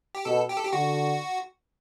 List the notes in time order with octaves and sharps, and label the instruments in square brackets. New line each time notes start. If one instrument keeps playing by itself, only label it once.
[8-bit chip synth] G4
[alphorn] B2 [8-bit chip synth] A4
[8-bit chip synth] G4
A4
G4
[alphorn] D3 [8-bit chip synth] F#4